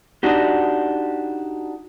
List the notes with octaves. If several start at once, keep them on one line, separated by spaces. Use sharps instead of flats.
D4 D#4 F#4 G4